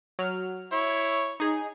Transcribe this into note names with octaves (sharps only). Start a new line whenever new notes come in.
F#3 F6
E4 C#5
D#4 G#4